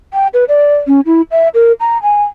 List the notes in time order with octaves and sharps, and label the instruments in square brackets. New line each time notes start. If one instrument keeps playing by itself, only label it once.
[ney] G5
B4
D5
C#4
E4
E5
A#4
A#5
G#5